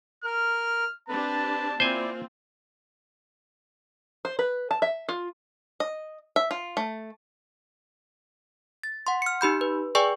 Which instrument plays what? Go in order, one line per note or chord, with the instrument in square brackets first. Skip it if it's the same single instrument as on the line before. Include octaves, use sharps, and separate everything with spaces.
[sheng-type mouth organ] A#4 [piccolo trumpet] F6
[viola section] C4 D4 G4 [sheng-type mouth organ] B4 [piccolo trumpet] A5
[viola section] A#3 C4 F4 [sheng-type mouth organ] E4 D5 [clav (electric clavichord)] C5 G#5
[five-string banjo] C5
B4
A5
E5
F4
D#5
E5
F4
A3
[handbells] A6
F#5 C6
F6 C#7
D#4 G4 B5 G6
B4
G#4 B4 D5 G5 G#5 C#6